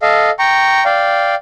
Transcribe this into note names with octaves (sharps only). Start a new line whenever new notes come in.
A4 D#5 F5
G5 A#5 C#6
D5 F5 G5